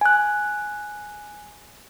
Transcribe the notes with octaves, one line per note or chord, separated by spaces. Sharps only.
G#5 F#6